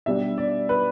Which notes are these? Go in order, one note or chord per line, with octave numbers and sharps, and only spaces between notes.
B2 G3 D4 E5
D5
B4